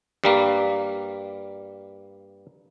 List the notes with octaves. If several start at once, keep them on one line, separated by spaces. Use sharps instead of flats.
G2 G3 A#3